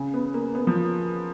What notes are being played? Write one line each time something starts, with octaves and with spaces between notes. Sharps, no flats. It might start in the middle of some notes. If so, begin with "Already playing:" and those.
Already playing: C#3
B3
A#3
B3
F3